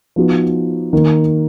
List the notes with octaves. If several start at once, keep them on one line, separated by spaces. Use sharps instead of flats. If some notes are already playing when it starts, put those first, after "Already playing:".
F3 B3 D#4 F#4
D#3 A#3 D#4 A#4